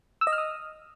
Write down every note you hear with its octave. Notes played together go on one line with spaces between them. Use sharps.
E6
D#5
F6
D#6